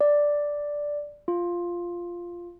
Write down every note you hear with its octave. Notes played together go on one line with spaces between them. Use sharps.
D5
F4